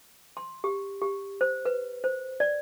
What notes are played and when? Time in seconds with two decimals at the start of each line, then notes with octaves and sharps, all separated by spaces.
0.37 C6
0.64 G4
1.02 G4
1.41 C5
1.65 B4
2.04 C5
2.40 D5